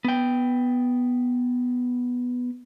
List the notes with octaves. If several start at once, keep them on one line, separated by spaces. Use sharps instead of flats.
B3 G5